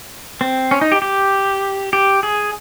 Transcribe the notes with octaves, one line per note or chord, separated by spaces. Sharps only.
C4
C#4
D#4
G4
G4
G4
G#4